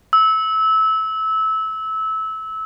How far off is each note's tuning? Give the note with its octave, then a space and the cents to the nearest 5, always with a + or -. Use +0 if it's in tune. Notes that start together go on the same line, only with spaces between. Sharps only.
E6 -20